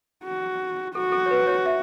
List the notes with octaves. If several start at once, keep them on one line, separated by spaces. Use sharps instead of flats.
F#4
F#4 A4
A4
C#5
B4
C#5
E5